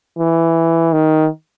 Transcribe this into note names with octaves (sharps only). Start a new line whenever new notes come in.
E3
D#3